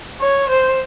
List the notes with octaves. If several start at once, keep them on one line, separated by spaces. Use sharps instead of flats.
C#5
C5